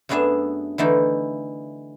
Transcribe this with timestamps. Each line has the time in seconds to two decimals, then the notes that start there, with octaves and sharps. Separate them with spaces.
0.09 F#2 A3 B3 D4 G#4 E5
0.78 D3 E3 A3 D#4